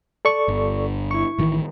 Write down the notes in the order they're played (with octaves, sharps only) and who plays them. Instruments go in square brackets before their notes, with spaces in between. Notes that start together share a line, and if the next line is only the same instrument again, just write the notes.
[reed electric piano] A4 D5 C#6
[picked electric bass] G1
[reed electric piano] E4 C#6
[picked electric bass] A1 D#3 E3